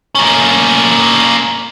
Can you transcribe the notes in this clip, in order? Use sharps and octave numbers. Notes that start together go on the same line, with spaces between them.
A#3 C#4